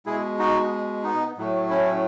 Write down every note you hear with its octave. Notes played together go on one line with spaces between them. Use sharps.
B2 G#3 E4 G#4
D#4 F#4
B3 D#4
A2 F#3 A3
C#4 E4